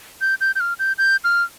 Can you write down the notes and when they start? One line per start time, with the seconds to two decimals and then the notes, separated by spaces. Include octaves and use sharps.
0.21 G6
0.41 G6
0.55 G6
0.60 F6
0.79 G6
0.98 G6
1.24 F6